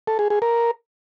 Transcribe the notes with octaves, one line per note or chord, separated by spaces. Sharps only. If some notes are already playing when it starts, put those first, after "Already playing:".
A4
G#4
G#4
A#4